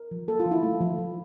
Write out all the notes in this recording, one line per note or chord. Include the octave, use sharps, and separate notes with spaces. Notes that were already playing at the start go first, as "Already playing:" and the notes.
Already playing: A#4
F3
A#3 A4
F4
F3
E4
A3
F3
F3